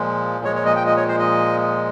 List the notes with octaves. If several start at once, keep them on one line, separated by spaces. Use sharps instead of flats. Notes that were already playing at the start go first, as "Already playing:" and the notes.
Already playing: A#2 F3 G#3
A#2 F3 G#3 C#5
C#5
D#5
G5
D#5
C#5
C5
D#5